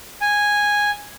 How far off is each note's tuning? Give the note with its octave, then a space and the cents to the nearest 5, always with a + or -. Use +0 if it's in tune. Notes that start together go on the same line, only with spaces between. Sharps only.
G#5 -10